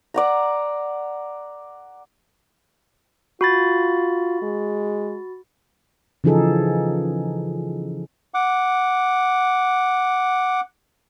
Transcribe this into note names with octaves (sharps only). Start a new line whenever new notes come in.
D5 F#5 A#5
F4 F#4 B5 A6
G#3
C#3 E3 F3 D#4 G#4 A4
F#5 D6